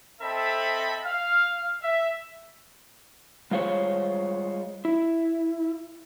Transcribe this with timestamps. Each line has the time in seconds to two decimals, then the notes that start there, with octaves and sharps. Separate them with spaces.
0.21 C4 A4 D#5 E5 B5
1.04 F5
1.81 E5
3.51 G3 G#3 F4 C5 C#5
4.85 E4